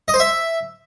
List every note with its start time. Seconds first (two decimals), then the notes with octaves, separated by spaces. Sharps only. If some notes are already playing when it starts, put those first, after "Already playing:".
0.08 D#5
0.14 C5
0.20 E5